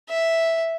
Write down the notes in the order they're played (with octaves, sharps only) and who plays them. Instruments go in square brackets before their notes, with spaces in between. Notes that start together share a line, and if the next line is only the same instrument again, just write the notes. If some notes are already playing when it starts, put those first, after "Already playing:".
[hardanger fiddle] E5